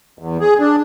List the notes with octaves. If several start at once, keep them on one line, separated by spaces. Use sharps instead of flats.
E2
G#4
D4